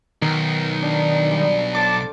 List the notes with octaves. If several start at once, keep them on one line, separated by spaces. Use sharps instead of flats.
B1 D#3
D4
G3 D#5
A4 C5 F5 A5 D6